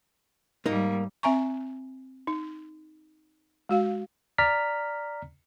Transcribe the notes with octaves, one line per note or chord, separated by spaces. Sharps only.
G#2 G3 A#3 D#4
C4 E5 G#5 A#5 C#6
D#4
G#3 F#4 F5
D5 A#5 F6 B6